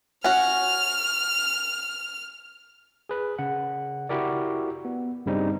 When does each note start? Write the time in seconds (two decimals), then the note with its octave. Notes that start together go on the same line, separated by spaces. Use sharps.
0.24 C#4 F#4 F6
3.09 G#4 B4
3.39 C#3 F#5
4.09 E4 F#4 G4 A#4 D5
4.85 B3
5.26 G2 C#3 G3 C4 D#4